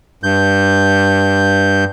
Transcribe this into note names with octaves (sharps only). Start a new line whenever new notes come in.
G2 G6